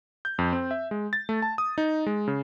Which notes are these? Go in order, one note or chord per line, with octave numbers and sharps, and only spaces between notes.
G6
F2
C4
E5
G#3
A6
A3
A5
D#6
D#4
G#3
C#3